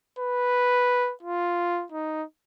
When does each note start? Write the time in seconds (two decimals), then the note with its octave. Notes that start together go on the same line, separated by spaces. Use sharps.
0.18 B4
1.23 F4
1.92 D#4